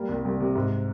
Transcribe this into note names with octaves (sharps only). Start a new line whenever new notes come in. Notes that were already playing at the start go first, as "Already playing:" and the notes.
Already playing: G3 A#3
C2
C2
C3
G#2